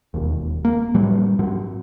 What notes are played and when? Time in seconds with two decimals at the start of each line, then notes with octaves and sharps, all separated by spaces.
0.14 E1 D#2
0.65 A#3
0.95 A2 F#3 G3
1.39 G#2 F#3